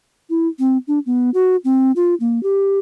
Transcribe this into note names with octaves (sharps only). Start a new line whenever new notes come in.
E4
C4
D4
B3
F#4
C4
F4
A#3
G4